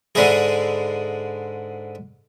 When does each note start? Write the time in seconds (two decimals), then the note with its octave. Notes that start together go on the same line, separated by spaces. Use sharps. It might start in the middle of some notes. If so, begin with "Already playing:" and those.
0.15 G#2 D3 G#3 E4 G#4